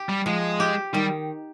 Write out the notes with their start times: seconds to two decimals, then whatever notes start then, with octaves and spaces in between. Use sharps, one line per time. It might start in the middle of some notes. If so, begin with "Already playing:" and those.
Already playing: G4
0.09 G3
0.26 F3 G#3
0.60 G4
0.94 D#3 G3